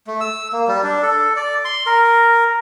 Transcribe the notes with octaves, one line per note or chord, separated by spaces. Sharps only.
A3
E6
A#3
G3
D4
A4
D5
C6
A#4